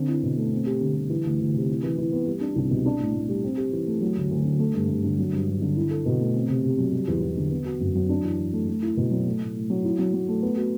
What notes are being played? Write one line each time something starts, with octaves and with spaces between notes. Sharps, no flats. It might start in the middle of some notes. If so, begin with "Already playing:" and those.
Already playing: D3 C4
E4
B2
A3
C4
G4
D3
G3
E3
D2
D2
C3
E4
E3
E3
B3
G3
D4
C2
B2
D4
A2
A2
G3
C4
G4
E3
A3
F#3
D2
D2
D3
A3
G2
G2
D3
F#3
G2
G2
D3
E4
A4
B2
A3
C4
C3
C3
F#3
G3
E2
E2
D3
B3
F#4
F#2
F#3
D4
E3
E3
A3
A3
E4
B2
F#3
A3
A2
A2
F#3
E4
F#3
F#3
A3
B3
F#4